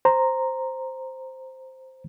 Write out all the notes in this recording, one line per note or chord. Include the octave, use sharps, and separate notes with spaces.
C5 A#5